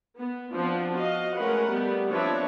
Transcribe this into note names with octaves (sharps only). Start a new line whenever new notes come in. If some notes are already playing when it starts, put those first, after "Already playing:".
B3
F3 B3 C4 D4 F4
F#4 D#5 F5
G#3 A3 C#4 A#4 B4 F#5
G3 A3 B3
F3 C4 D4 B4 C#5 E5